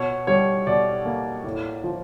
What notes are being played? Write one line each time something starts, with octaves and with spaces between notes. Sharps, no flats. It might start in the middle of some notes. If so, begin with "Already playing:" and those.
Already playing: B2 C#5
G3 C#5
B2 D5
A#3
A2
F3